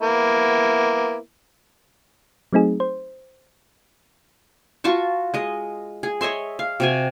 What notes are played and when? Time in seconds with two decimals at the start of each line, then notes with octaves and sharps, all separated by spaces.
0.01 A#3 B3 E4
2.53 F#3 A3 C4 D#4 G#4
2.80 C5
4.84 F4 F#4 A5 C#6
5.34 G#3 D#5
6.03 G#4
6.21 C#5 D#5 E5 C6
6.59 F5
6.80 C3 F#4 G#5